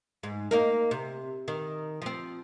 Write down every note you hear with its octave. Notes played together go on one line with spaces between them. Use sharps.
G#2
A#3 D#4 A#4
C3
D#3
F3 C4